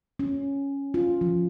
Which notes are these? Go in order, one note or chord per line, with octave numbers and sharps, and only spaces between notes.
C#4
F4
F3